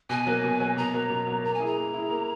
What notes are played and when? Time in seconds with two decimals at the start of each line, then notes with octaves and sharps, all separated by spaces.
0.09 B2 G#5
0.27 F#3 A#3
0.44 B2
0.60 F#3 A#3
0.77 B2 A#5
0.94 F#3 A#3
1.10 B2
1.27 F#3 A#3
1.44 A#3 A#5
1.54 G#5
1.60 E4 G#4
1.66 A#5
1.77 A#3
1.94 E4 G#4
2.10 A#3